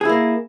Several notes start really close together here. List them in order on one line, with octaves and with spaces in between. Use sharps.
G#4 E4 A#3